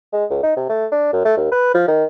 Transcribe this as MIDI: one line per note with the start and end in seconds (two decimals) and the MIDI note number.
0.13 0.25 56
0.30 0.43 37
0.43 0.52 63
0.57 0.69 48
0.70 0.86 57
0.92 1.11 62
1.13 1.23 42
1.25 1.34 57
1.37 1.49 39
1.52 1.72 71
1.74 1.83 53
1.88 2.04 51